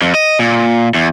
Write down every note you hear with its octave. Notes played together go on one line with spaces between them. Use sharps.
F2
D#5
A#2
E2